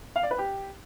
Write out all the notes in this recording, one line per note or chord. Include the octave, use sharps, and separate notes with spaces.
F5
D5
B4
G4